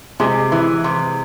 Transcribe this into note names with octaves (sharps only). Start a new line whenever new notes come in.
C3 G#3 G#4
E3
C3